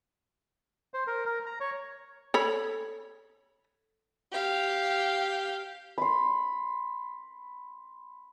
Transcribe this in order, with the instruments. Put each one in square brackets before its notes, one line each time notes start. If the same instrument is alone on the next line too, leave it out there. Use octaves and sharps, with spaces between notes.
[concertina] C5
A#4
A#4
A#5
C#5
[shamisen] A4 C#5 B5
[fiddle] G4 F5
[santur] B5 C6